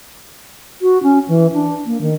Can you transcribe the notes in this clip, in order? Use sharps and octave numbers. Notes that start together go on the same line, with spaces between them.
F#4
C#4
E3
D4
A#3
D#3